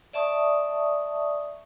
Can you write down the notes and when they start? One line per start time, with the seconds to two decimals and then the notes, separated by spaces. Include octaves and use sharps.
0.13 D5 E5 A5 C#6 D#6